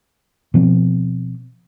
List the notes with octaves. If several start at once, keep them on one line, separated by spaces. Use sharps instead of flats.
B2 F3 C4